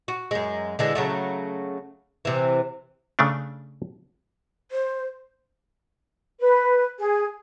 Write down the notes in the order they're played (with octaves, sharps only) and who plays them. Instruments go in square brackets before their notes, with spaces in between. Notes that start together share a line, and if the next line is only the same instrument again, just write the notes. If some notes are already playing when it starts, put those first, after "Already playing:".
[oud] F#4
F#2 G#3
D3 E3 G#3
C#3 F#3 A3
C3 E3
[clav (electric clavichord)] C#3 A3 D4
[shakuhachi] C5
[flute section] B4
G#4